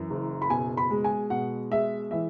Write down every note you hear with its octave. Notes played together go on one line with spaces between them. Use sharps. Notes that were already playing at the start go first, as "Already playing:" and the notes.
Already playing: F#2 E3
F#1
B5
B2 G#5
B5
G#3
G#5
B2 F#5
G#3 E5
E3 E5